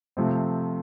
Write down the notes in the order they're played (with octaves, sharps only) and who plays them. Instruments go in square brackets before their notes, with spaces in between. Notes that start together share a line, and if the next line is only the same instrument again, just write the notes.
[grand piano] C3 F3 A3 C4